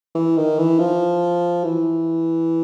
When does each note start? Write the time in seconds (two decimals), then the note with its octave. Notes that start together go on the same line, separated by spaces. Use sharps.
0.15 E3
0.37 D#3
0.59 E3
0.79 F3
1.64 E3